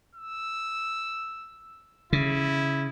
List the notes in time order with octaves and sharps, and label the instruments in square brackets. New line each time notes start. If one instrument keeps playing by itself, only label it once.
[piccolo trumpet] E6
[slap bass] C#3 [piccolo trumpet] E4